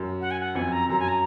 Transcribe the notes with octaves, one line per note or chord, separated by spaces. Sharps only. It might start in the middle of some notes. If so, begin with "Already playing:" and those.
Already playing: F#2
F#5
G#5
F#5
F2 G#5
A#5
F#2 A#5
G#5
A#5